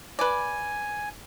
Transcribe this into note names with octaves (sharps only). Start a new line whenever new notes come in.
B4 D5 G#5